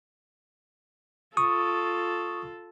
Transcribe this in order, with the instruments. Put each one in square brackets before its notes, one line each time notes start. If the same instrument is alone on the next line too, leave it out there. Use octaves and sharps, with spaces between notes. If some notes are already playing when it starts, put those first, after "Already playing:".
[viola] F4 A4 [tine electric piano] C#6 D#6